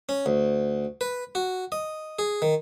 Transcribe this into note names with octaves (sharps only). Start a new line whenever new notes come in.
C#4
D2
B4
F#4
D#5
G#4
D#3